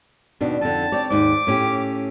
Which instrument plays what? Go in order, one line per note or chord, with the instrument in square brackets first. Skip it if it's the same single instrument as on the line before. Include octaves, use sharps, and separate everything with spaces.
[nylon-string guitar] D#2 B2 D4
[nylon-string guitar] F2 D3 [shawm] A5
[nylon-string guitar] C4 C#5 D5
[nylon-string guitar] D#2 G#2 [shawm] D6
[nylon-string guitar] A2 C#4 G4